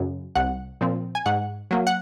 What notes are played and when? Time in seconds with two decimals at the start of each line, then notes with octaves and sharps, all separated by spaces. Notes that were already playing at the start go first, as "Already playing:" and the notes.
Already playing: F#2 C#3
0.35 C2 F#5
0.81 A#2 F3 C4
1.15 G#5
1.26 G#2 F#5
1.71 F#3 A#3
1.87 F#5